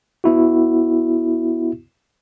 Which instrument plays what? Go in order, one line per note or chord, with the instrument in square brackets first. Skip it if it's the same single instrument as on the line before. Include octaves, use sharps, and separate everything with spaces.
[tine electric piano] B3 E4 F#4